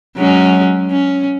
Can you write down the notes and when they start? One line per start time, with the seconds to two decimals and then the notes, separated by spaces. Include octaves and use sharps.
0.17 F#3 G#3 C#4
0.91 C#4